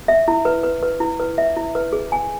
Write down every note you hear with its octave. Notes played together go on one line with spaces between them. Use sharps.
E5
E4
B4
B4
B4
E4
B4
E5
E4
B4
G#4
G#5